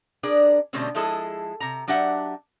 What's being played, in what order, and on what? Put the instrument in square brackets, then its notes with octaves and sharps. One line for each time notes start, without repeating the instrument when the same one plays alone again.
[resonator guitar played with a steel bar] D4 G#4 A#4 D5
B2 D3 G3 A3 C4 C#4
F3 G#3 E4 G#4 A4
C3 A#5
F#3 D4 G4 E5 F#5